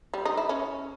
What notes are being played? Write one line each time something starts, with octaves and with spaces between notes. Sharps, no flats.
G3
D#4
E4
C#4